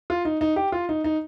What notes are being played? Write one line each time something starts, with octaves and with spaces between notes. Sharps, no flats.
F4
D#4
D#4
G4
F4
D#4
D#4